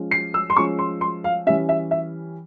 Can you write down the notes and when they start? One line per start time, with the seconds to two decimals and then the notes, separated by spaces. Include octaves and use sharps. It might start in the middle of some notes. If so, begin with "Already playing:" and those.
Already playing: F3 G#3 C#4
0.11 C7
0.34 E6
0.50 C6
0.56 F3 G#3 C#4 C#6
0.79 C6
1.01 C6
1.24 F5
1.46 E3 G3 C#4 E5
1.69 E5
1.91 E5